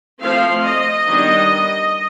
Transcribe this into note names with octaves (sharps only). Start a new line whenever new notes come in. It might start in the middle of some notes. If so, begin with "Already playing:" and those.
F3 A3 C4 F5
D#5
D#3 G3 B3 D4